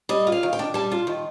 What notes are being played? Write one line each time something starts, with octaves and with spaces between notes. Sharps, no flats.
G3 D#5
F4
F5
D#3
G5
D4
G3 A5
F4
D#3